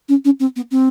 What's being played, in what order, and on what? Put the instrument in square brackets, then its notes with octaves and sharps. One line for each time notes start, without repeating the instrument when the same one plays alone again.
[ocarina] C#4
C#4
C4
B3
C4